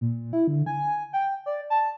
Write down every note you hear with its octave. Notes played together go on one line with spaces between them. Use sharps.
A#2
E4
D3
G#5
G5
D5
A5